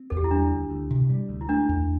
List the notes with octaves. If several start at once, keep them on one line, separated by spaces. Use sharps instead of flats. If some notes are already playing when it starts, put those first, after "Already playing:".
Already playing: C4
E2 A4
G4
E4
G3 D4
D2
D2
C3
G3
D2
E4
A3 D4
E2